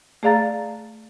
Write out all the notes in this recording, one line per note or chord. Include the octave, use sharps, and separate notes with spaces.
A3 G#4 D5 F5 A#5 A6